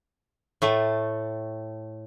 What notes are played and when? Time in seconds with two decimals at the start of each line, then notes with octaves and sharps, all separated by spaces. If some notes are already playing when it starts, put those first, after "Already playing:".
0.62 A2 A3